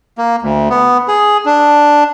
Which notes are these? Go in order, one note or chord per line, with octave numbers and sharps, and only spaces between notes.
A#3
D2
B3
G#4
D4